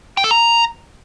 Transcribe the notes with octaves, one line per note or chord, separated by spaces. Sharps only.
G5
A4
A#5